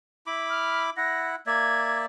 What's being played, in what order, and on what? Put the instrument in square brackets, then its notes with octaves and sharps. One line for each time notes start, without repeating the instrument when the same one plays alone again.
[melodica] E4 B5 D6
[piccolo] F6
[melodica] E4 F#5 [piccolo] A#6
[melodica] A#3 D5 E5 [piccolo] G#6